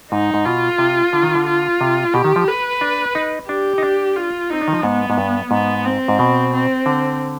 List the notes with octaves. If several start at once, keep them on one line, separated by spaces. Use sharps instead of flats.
G#2 D#4
G#2
B2 F4
C3
D3
D#3
D3
F4
C3
B2 G4
D#3
F3
B4
D4
D#4
D4 G4
D#4
D4
F4
C4 D#4
D4
D#3
F3
G#2 B3
G#2
G2
G#2 B3
C4
G#2
B2
C4
D3